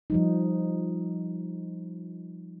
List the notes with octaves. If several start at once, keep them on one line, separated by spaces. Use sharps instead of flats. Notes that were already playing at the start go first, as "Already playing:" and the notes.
F3 G3 D#4